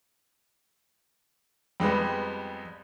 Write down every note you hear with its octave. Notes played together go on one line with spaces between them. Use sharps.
F2 G3 G#3 B3